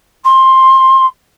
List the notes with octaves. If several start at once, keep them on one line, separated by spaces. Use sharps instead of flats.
C6